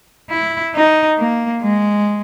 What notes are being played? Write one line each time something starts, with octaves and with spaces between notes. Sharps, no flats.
E4
D#4
A#3
G#3